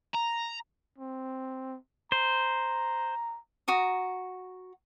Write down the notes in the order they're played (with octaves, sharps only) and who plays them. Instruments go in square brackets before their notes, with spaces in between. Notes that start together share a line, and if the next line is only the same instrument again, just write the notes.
[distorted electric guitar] A#5
[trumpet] C4
[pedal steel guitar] C5 [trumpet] A#5
[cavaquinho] F#4 A#5 D#6